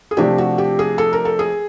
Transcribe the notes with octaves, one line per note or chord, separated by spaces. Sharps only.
G#4
C3 F3 A3 D4 G4
F#4
G4
G#4
A4
A#4
A4
G#4